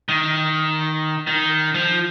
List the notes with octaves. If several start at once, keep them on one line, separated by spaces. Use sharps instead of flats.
D#3
D#3
F3